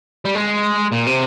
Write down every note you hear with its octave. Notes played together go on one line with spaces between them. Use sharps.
G3
G#3
A#2
C3